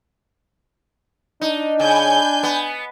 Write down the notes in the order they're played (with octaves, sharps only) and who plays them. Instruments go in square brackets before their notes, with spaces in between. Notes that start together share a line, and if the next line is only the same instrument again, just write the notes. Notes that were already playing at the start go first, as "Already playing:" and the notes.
[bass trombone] D4 [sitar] D#4
[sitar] C#3 [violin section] G#5 G6
[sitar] B3